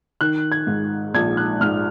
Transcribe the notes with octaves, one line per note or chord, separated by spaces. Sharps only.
D#3 F#6
G#6
G#2
A#1 G#6
F#6
G#2 F6